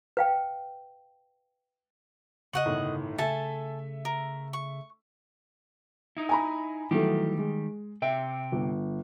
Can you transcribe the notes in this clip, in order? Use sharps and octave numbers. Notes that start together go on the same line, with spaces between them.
B4 F5 G5
C#3 D#5 F#5 C#6 F#7
G1 A2 D#3
C#3 A3 A4 E5 G#5 A5
A#4
C#6
D#4 E4
G#5 A#5 B5
D#3 E3 F#3 G3 A3 G4
G#3
C3 E5 G5
G1